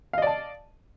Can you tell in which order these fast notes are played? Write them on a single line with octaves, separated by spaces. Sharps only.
F5 D#5 D5 A5